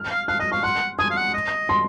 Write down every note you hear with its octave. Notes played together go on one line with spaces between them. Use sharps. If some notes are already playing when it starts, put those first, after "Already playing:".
Already playing: F6
F5
F5 F#6
D#5 F6
F5 C#6
F#5 C6
G#5 D#6
F5
F#5
D#5
C6